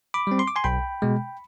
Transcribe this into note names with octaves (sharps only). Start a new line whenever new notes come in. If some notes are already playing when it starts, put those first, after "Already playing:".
B5 D6
G3 C4
C6
D6
G#5 C6
B1 G5 B5
B2 G#3